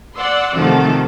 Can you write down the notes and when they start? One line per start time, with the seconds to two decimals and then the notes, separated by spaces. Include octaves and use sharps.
0.15 D5 F#5 C6 E6
0.55 C3 D#3 F3 A3 F#4 A4